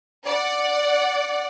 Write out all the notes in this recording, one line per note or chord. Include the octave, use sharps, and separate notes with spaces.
D5 F#5